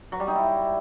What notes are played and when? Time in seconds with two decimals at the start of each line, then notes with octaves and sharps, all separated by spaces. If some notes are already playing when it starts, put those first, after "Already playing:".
0.12 F#3
0.20 G3
0.28 D#4
0.35 E4